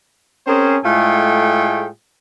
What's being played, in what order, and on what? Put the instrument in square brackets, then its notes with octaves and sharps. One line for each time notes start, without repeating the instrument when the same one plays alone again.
[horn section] C4 C#4 G#4 A#4 C5
A2 G#3 A3 F4 G#4 G5